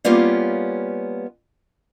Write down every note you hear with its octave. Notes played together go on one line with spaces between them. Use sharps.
G3 A#3 B3 C#4 F4 G4